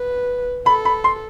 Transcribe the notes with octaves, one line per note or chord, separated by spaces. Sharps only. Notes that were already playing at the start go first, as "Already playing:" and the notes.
Already playing: B4
A4 B5
B5
C6